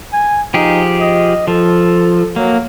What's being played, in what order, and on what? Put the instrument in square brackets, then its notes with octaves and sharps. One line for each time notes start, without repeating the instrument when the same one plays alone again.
[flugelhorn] G#5
[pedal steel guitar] F3 G4 G#4 [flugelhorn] D#4
[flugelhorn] D#5
[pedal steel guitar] F3 [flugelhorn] A4
[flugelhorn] F#3 [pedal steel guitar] A#3